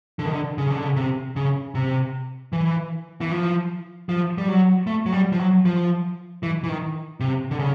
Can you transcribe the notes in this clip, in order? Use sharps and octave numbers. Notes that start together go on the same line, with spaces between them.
D3
D#3
D3
C#3
D3
C#3
C3
C#3
C3
E3
E3
F3
F3
G3
F#3
A3
F#3
G3
F3
F#3
F3
E3
E3
D#3
C3
D3
C#3